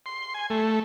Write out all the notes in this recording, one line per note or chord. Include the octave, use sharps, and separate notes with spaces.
C6
G#5
A3